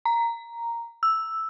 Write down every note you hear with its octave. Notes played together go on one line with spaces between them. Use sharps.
A#5
E6